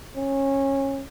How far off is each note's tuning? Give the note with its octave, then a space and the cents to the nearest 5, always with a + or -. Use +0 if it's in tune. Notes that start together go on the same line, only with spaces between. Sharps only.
C#4 -20